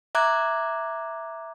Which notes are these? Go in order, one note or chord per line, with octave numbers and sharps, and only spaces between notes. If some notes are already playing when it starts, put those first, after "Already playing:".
E5 A#5 D6 F#6 G#6